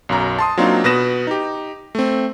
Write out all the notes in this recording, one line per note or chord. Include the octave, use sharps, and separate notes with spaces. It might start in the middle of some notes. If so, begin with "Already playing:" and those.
B1 F#2 A#5
A5 C6 D#6
F#3 A#3 C4 D4 D#4 F4
B2 B4 D#6 A#6 E7
D#4 G4
A3 C4